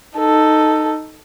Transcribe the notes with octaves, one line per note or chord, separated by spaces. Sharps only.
D#4 A4